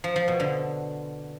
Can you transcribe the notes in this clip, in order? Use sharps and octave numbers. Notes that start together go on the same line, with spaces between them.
F3
F3
B2
D3